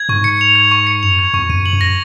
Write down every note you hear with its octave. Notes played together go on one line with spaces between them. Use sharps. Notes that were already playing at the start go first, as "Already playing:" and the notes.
Already playing: G#6
G#2 C#6
C#7
F7
G#6
C#6
C#7
F#2 F7
G#6
F2 C#6
F#2 D#7
F#7
F#2
A#6